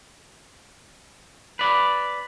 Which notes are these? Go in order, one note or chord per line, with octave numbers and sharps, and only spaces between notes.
B4 D5